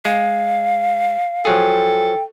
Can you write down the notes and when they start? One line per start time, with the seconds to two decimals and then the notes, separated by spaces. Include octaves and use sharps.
0.05 G#3 F5
1.45 F3 F#3 G#4 A4 G5